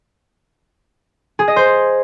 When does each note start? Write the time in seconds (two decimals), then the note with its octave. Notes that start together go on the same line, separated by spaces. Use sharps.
1.39 G#4
1.48 D#5
1.56 C5